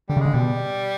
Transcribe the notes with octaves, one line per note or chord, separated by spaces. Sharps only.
D3 G3
C#3
D3 G#3
B2 G3